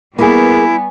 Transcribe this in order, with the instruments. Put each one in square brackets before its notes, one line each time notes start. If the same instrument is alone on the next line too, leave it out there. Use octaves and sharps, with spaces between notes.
[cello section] G3 B3 [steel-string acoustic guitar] A#3 G#4 [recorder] E4 [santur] G#5 C#6